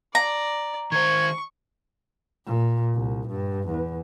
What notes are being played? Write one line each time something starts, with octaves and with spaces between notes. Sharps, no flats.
D5 A#5
D#3 C5 C#6 G#6
A#2
C2
G2
E2